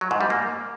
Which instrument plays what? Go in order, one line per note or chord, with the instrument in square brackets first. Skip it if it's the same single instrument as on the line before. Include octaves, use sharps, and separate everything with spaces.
[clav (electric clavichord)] F#3
G#2
G3
A#3